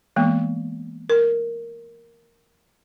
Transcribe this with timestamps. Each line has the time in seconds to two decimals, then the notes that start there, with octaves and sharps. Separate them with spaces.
0.16 E3 G#3 A#3 B3
1.10 A#4